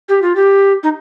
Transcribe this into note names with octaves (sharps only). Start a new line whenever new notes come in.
G4
F4
G4
D#4